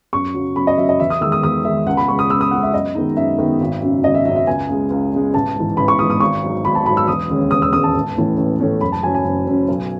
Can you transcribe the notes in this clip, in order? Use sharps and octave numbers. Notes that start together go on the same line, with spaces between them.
F#2 C#6
C#3 F#3
F#2 B5
D#5
C#3 F#3 E5
D#5
E2 E5
D#6
D#3 G#3 E6
D#6
E2 D#6
D#3 G#3 E5
C#2 F#5
B5
C#3 G#3 C#6
D#6
C#2 E6
D#6
C#3 G#3 F#5
E5
F#2 D#5
D#3 G#3 B3 D#4
F#2 E5
D#3 G#3 B3 D#4
G#1
F#2 C#3 F#3
G#1 D#5
E5
F#2 C#3 F#3 E5
E5
C#2 G#5
C#3 G#3
C#2
C#3 G#3
A1 A5
G#2 E3
A1 B5
C#6
G#2 E3 D#6
D#6
G#1 C#6
G#2 F#3
G#1 B5
A5
G#2 F#3 B5
E6
E1 D#6
D#2 C#3 G#3 C#4
E1 D#6
E6
D#2 C#3 G#3 C#4 D#6
A5
A1
A2 E3 A3 C#4
A1
A2 E3 A3 C#4
F#1 B5
A5
F#2 C#3 F#3 C#4 G#5
G#5
F#1
F#2 C#3 F#3 C#4
B1